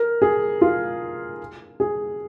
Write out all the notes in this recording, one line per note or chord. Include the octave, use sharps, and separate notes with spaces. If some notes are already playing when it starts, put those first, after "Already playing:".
Already playing: A#4
G#4
F4
G#4